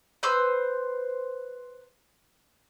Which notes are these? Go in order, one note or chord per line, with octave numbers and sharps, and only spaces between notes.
B4 C5 E6